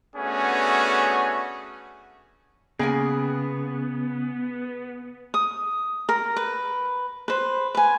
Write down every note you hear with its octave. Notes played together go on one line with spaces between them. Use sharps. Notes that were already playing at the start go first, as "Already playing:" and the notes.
A3 B3 C#4 D4 F#4 G#4
C#3 A#3 B3 G#4 G5 G#5
D#6
A#4
B4
B4 C5
B4 G#5